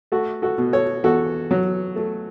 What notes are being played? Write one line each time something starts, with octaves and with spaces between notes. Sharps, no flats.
A3 F#4 A4
F#4 A4
B2
A4 C#5
E2 F#4 A4
F#3
A3